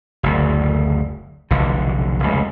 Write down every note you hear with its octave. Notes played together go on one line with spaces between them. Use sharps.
F#1 D2
F1 B1 D3
F1 C#2